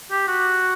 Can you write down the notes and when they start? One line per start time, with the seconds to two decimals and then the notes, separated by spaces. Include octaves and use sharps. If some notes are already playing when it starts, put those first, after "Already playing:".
0.11 G4
0.28 F#4